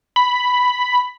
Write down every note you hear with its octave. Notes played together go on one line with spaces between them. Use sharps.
B5